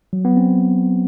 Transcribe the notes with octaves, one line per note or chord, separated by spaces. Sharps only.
F#3
B3
C4